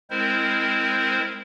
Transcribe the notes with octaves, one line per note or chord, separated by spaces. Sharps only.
G#3 C4 E4 A#4 C5